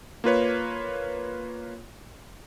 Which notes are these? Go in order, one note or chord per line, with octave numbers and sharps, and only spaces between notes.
A#3 F4 B4 C#5